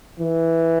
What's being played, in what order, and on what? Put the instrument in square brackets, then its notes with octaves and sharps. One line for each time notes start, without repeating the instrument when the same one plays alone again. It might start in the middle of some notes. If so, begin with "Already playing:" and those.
[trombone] E3